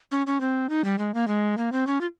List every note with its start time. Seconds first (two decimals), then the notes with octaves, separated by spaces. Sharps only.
0.11 C#4
0.27 C#4
0.41 C4
0.69 D#4
0.84 G3
0.98 G#3
1.14 A#3
1.28 G#3
1.58 A#3
1.72 C4
1.87 C#4
2.01 F4